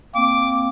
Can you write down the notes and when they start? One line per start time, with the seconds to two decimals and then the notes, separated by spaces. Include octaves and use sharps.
0.15 A#3 C4 D6